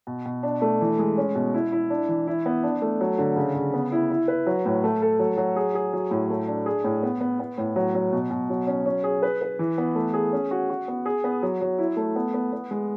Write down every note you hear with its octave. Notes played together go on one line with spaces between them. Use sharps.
B2
B2
D4
A3
E3
G#3
C#4
B2
E4
E4
D4
E3
E4
B3
D4
A3
F#3
D3
C#3
C#3
B3
E4
E4
B4
F#3
A2
A3
A4
F#3
F#3
G#4
G#4
F#3
A2
A3
D4
G#4
A2
B3
B3
B3
A2
F#3
F#3
B2
B2
F#3
C#4
C#4
G#4
B4
B4
E3
B3
A3
G#4
C#4
F#4
F#4
B3
G#4
B3
F#3
F#3
E4
A3
B3
B3
B3
G#3